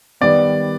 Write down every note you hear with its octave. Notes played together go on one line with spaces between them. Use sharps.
D#3 G3 B3 D5